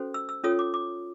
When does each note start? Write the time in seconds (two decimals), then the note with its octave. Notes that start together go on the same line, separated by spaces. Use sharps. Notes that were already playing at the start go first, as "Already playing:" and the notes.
Already playing: C#4 F#4 A4 C5
0.14 E6
0.29 E6
0.44 C#4 F4 A4 C#5 D#6
0.59 D6
0.74 D6